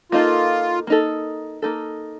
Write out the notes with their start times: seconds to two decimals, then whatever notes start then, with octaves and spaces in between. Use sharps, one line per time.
0.12 A#3 D#4 F4 A4
0.87 A#3 D#4 A4
1.62 A#3 D#4 A4